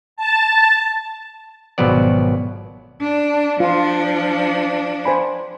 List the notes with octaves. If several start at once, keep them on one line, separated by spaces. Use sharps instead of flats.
A5
G#1 B2 F3 F#3 B3 D5
D4
F3 D4 F4
C5 G#5 B5